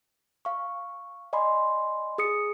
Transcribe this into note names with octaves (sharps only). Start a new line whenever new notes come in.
F5 C#6
D5 D#5 G#5 B5 C6
G#4 D#6 C#7